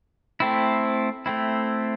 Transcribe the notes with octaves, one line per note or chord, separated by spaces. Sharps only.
A3 C4 E4
A3 C4 E4